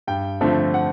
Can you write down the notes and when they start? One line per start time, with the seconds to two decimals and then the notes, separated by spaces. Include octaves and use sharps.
0.07 G2 G5
0.41 D3 F3 A3 C4
0.74 F#5